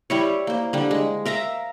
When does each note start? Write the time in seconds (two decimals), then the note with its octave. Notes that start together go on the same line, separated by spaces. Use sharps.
0.10 G3 E4 C#5
0.47 A#3 C5
0.73 D3 G3
0.91 G#3
1.25 A#4 E5 F5 A#5